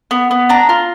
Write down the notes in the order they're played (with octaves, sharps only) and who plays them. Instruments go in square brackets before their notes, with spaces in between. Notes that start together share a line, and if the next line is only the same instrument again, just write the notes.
[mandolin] B3
B3
D4 A#5
F4